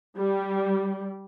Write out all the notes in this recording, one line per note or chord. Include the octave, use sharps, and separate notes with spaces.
G3